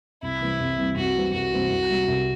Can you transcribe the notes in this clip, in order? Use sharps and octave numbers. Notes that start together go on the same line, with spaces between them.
C2 E4
C3 E3 G3 C4
C2
C3 E3 G3 C4
C2 F#4
C3 E3 G3 C4
C2 F#4
C3 E3 G3 C4
C2
C3 G3
C2